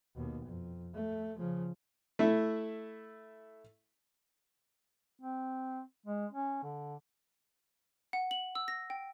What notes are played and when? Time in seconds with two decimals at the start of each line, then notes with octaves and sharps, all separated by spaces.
0.16 D#2 B2
0.45 F2
0.94 A3
1.38 C#3 F3
2.19 A3 E4
5.21 C4
6.06 G#3
6.32 C#4
6.63 D3
8.13 F#5
8.31 F#7
8.55 E6
8.68 A#6
8.90 G5